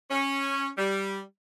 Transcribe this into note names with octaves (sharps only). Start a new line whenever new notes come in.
C#4
G3